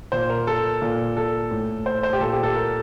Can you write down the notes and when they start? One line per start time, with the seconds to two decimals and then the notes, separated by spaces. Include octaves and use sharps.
0.12 A#2 C5
0.30 A#4
0.47 A4
0.82 A#2
1.17 A4
1.51 A2
1.86 C5
2.03 C5
2.13 G4
2.20 A#2 A4
2.33 G4
2.43 A4
2.55 A#4